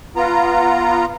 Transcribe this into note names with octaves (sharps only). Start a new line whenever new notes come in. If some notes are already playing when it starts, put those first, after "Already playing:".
B3 F4 A#5